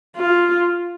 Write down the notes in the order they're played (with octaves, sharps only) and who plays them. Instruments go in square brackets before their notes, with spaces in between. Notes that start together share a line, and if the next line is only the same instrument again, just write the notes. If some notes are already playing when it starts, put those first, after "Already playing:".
[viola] F4